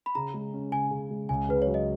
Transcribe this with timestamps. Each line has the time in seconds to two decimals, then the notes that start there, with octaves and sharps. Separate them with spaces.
0.06 B5
0.15 C#3 A#5
0.34 G#3
0.54 C#4
0.72 C#3 G#5
0.91 C#3
1.11 G#3
1.29 C#2 G#5
1.49 C#3 B4
1.62 C#5
1.67 F#3
1.74 D#5